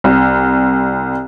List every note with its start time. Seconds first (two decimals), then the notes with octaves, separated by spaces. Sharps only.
0.04 C2